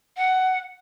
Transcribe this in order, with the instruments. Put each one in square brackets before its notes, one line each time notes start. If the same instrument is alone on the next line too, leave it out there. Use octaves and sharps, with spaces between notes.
[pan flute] F#5